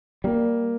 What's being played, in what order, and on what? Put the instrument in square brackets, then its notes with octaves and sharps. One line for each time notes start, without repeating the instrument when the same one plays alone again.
[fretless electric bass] G3 [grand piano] A#3